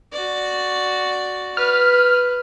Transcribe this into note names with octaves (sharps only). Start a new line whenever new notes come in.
F#4 D5
B4 F6